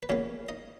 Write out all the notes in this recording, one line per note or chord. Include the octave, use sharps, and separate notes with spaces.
B4
A#2 F3 G#3 B3 C#4 C#5
D#4 D#5